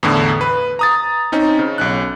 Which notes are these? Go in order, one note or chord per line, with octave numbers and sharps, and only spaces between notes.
E2 A2 D3
B4
A#5 D#6 A6
C4 C#4 D#4
C#3
B1 C#4 F#6